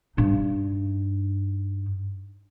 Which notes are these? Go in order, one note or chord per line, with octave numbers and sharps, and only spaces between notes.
G2 D#4